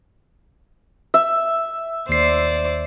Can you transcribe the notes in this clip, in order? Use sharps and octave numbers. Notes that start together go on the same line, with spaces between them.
E5
D#2 C5 D5 C7